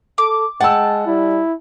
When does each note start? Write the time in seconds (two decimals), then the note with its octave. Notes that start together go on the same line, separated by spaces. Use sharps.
0.18 A4 D6
0.61 G#3 F#5 G5 A5 E6
1.07 G3 E4